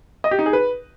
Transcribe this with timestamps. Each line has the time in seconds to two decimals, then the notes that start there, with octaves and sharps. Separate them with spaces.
0.24 D#5
0.31 G4
0.39 D#4
0.46 G#4
0.53 B4